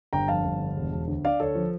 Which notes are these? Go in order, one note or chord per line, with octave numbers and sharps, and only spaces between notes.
G1 G5 A#5
F2 F5 A5
G1
D3
E1
E1
D2
D3 D5 F5
D2 A4 C#5
F3